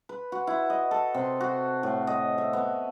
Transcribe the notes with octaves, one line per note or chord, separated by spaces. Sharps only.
B4
F#4
E4
D#5
A4
C3
F#4
A2
D#5
E5
B3